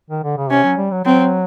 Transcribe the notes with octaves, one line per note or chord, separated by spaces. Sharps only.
D#3
D3
C#3
C3 C#4
F#3
G3
F#3
F#3 C4